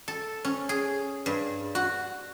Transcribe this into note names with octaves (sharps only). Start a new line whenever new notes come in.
A4
C#4
G#4
G2
F#4